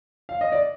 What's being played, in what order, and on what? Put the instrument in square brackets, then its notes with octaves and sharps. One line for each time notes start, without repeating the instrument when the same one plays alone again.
[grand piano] F5
D#5
D5